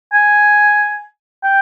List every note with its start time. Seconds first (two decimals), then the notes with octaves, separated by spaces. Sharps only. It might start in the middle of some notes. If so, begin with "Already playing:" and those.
0.13 G#5
1.44 G5